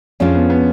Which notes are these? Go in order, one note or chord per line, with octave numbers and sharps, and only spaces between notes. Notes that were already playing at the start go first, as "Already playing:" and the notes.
F2 F3 G#3 C#4 D4 F4
B3
B3